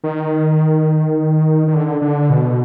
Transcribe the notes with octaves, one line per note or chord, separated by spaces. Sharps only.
D#3
D#3
D3
D3
B2